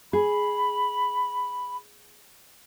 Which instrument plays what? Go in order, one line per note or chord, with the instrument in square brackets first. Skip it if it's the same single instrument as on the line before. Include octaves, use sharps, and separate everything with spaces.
[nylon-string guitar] G#4 [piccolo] B5